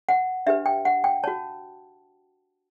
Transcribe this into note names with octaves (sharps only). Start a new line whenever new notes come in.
F#5
D4 G4 B4 E5
G5
F#5
G5
F#4 C#5 A5